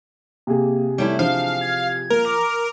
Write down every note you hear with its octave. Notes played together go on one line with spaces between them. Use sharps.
C3 A#3 G#4
G3 A3 E4 C#5
F3 D4 F5
G#6
A#3 A#4
D6 F7